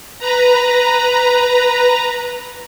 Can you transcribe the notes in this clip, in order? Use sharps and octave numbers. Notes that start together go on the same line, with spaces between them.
B4 A#5